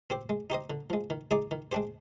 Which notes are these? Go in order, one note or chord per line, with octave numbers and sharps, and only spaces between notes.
C4 G4 C5
G#3
D#4 G4 C5 D#5
D3
F3 G#3
D#3
G#3 D#4 G#4 D5
D#3
G#3 D4 G4 C5